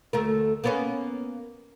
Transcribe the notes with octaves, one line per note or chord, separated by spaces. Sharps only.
D2 A3 A#4
A#3 B3 C#4